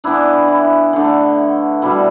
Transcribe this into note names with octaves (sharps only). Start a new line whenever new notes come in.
E3 B3 D4 E4
E4
D3 A3 D4
B2 G3 D4 E4